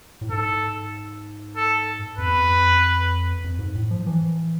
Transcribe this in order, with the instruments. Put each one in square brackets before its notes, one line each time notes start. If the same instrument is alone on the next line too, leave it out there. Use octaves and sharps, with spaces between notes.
[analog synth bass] A2
[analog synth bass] G#2 [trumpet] A4
[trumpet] A4
[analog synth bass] F2 [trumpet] B4
[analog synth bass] E2
F2
F2
G#2
A2
F3
E3